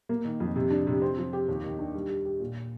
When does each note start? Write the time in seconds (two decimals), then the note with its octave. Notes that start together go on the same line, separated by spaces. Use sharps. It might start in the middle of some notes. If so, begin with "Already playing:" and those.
0.09 A#3
0.25 D#3
0.40 F2
0.56 C3
0.71 D4
0.87 C3
1.02 C4
1.17 F3
1.33 G4
1.48 D#2
1.64 D#3
1.79 D4
1.94 G3
2.09 G4
2.25 G4
2.40 A#2